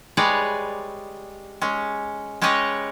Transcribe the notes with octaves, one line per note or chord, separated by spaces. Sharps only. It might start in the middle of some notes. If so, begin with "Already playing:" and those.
G3 G#3 G#4 B4 C#5 D5
G#3 C#4
G#3 C#4 G4 B4 C#5 D#5